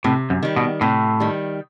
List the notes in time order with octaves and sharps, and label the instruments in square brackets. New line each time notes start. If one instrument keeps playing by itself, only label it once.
[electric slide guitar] A2 [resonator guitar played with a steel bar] C3
[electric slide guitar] F#2
[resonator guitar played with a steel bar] D#3 G3
[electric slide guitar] B2
[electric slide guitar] A2 [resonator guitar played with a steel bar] C3
[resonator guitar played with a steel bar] D#3 G3